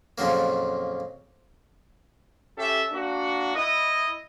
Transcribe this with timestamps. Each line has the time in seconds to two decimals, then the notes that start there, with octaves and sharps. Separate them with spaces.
0.18 F2 A#2 C#3 F#3 A#3
2.58 C#4 G4 A4 E5
2.92 A#3 D4 F#4
3.56 E4 D#5